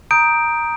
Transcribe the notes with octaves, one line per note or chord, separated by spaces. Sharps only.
A#5 D#6 G6 D7